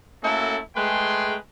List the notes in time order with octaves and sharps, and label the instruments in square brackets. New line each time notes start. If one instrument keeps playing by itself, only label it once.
[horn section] A3 A#3 C#4 E4 F#4 A4
G#3 A3 G#4 B4 G5 C6